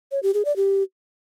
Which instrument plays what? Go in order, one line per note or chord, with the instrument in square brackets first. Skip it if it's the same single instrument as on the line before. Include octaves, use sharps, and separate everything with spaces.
[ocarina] C#5
G4
G#4
D5
G4